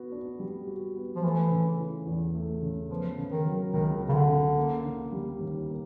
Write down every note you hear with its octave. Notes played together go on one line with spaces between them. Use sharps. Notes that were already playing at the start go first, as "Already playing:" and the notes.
Already playing: B3 F#4
D4
G3
F#4
B3
F3
E3 A3
C#3
E3
E2
A3
C#3
F3 B3
C#3
D#3
F#3
C#2 D#3
B3
C#3
D3
C#3
A#3
D3
G3
D#2
A#3